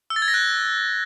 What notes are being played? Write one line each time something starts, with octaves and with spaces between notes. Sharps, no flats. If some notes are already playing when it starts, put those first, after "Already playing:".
E6
A6
G#6
A#6
F#6